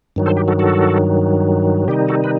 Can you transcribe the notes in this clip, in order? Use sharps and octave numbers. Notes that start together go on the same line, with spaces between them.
G2 D#3 F#3
A4 C5
G4
F#4 A4
F#4 A4
C3 D#3 G3 D#4 G4
F#4 A4
B4